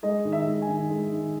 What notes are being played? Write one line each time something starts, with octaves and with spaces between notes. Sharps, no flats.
G#3 D#5
D#3
E5
G#3
G#5
D#3
G#3
D#3